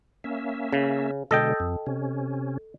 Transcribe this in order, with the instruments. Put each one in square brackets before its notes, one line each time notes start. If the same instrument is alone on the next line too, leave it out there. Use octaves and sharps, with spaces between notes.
[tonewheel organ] A#3 C#4 E5
[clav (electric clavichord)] C#3
[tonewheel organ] B2 D3 G#3 [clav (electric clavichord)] A4 D#5 G5
[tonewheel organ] F2
C3 C#4